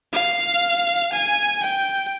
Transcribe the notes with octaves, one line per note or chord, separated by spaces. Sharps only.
F5
G#5
G5